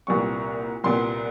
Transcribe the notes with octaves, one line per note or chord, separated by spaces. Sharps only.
C2 A#2 G3 B3 C#6
C2 A#2 G3 B3 C6